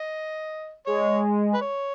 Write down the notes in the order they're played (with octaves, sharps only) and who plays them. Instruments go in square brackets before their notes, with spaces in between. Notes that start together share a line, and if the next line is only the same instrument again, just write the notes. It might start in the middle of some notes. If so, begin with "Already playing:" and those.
Already playing: [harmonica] D#5
[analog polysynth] G#3 [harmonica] C#5
[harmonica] B4
C#5